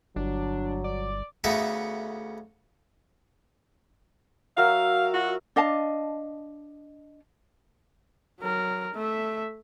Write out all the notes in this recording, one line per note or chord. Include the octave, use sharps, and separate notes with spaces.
G1 F#3 D4
D5
D2 C#3 B3 D#4 A4 E5
F#3 A#4 E5 F5
F4 F#4
D4 D#5 F5 A5
F#3 A#4
A3 E5